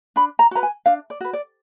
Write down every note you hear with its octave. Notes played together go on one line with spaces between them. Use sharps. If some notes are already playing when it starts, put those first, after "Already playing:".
D4 B5
A#5
F#4 B4 A#5
G#5
D4 F5
D5
F#4 B4
D5